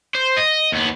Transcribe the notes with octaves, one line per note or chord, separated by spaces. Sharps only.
C5
D#5
D#2 B3